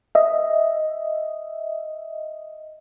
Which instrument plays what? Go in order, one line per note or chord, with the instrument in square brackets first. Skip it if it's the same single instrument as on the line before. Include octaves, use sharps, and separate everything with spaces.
[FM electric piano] D#5 E5